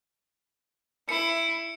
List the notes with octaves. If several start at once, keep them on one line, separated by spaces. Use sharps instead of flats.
E4 C#7